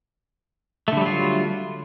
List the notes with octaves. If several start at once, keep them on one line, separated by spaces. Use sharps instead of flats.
D3 F#3 G3 A3 F4